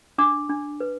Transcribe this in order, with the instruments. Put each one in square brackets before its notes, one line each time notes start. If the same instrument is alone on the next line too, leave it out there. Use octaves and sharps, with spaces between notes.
[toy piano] D4 D6
D4
B4